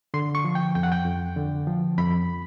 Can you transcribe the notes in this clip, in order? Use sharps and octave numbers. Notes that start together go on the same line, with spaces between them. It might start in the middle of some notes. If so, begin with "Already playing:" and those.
D3 C6
C#6
F3
G5
F2 G5
F#5
G5
F2
D3
F3
F2 B5